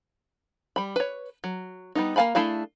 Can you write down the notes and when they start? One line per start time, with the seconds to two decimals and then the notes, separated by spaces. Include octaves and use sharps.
0.76 G3 B5
0.96 B4 C#5
1.44 F#3
1.95 G3 B3 D#4
2.16 A#3 B4 F5 G#5 B5
2.35 A3 D4 E4 G#4 F5